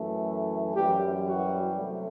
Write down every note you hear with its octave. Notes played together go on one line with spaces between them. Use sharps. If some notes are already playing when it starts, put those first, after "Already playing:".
Already playing: F#2 E3 A3
F#2 E3 G3 G4
F#4
C3 F#3 A3